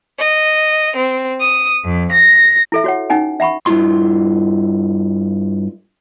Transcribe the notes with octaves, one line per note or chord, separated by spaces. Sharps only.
D#5
C4
D#6
F2
A#6
E4 A4 E5
F#4 C#5 F#5
C#4 D#4 F#5 G#5
E5 F#5 B5 C#6
G2 C#4 E4 F4 C6